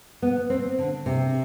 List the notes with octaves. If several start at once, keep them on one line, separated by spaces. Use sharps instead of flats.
B3
C4
D3
C3